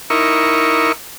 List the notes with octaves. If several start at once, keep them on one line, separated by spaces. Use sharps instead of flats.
D#4 E4 A#4 C#6